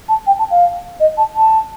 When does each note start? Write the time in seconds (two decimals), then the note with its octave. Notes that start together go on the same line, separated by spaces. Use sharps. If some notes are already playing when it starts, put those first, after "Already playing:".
0.08 A5
0.26 G5
0.38 A5
0.50 F5
0.99 D#5
1.17 A5
1.36 A5